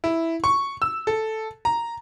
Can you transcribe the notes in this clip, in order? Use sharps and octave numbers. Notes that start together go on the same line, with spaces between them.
E4
C#6
E6
A4
A#5